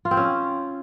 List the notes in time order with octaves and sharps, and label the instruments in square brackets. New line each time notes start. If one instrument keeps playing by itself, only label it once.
[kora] F4
C4
C#4